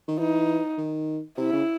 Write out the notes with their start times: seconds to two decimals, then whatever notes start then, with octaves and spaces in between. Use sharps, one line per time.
0.08 D#3
0.19 E3 D#4
0.78 D#3
1.37 C3 E4
1.52 C#3